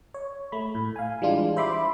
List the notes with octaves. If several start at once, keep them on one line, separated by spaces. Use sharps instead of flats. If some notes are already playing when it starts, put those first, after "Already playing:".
C#5
A3 B5
A2
F5 G#5
E3 G3 G#3 D4 F4
C5 E5 B5 C6 D6